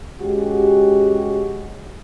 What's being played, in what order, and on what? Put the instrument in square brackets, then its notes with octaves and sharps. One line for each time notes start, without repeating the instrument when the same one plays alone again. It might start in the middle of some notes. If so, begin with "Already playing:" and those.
[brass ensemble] G#3 C#4 F#4 G4